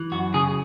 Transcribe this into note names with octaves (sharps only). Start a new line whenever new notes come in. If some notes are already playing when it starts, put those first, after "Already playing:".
Already playing: E3
F#2 F#4
C#3 G#4